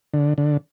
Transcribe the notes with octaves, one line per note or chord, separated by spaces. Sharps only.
D3
D3